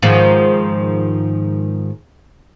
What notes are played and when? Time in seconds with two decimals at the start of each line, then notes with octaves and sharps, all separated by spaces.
0.02 G#2 D#3 F3